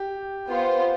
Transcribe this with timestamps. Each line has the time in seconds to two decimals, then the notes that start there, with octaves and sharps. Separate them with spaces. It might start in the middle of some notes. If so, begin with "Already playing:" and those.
Already playing: G4
0.48 B3 F4 C5